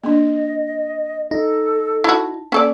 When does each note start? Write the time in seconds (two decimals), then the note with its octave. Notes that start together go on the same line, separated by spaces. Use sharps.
0.04 A#3 D4 D#5
1.31 D#4 A4
2.04 E4 F#4 A5
2.52 A#3 C#4 A4 D5